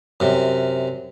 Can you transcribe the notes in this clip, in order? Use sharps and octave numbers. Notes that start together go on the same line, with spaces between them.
F#2 C3